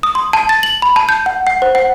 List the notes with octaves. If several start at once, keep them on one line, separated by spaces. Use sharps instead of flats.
D#6
C6
A5
A6
F#7
B5
A5
G6
F#5
F#5
C5
F#5